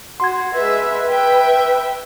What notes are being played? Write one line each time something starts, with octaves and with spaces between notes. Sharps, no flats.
F#4 C6 G#6
G#3 B4 E5
E5 G5